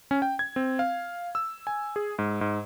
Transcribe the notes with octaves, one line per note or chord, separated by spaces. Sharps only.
C#4
G5
G#6
C4
F5
E6
G#5
G#4
G#2
G#2